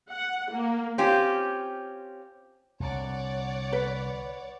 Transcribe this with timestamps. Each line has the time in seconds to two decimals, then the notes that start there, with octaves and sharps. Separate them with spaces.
0.11 F#5
0.51 A#3
0.98 C4 C#4 F4 G4
2.80 C2 D3 C#5 D5 F#5
3.72 B4